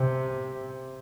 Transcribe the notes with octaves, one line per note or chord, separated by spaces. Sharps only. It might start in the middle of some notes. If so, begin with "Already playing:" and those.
Already playing: C3